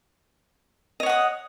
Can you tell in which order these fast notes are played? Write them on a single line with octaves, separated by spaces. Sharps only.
D#5 C#5 F#5 D#6